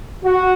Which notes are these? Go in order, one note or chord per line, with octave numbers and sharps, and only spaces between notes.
F#4